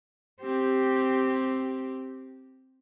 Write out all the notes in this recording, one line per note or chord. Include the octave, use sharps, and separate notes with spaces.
C4 G4